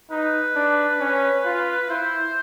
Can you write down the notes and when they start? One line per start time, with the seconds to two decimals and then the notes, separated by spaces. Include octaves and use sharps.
0.10 D#4 B4
0.56 D4
1.00 C#4
1.45 F4
1.89 E4 C5